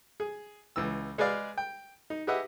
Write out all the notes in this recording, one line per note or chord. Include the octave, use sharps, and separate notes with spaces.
G#4
C#2 E3 E6
G#3 G#4 B4 D5 F5
G5
D#4
G4 G#4 B4 D#5 E5 F#5